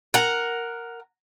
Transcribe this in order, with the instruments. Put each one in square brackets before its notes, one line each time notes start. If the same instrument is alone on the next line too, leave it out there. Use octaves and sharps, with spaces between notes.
[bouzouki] A#4 F#5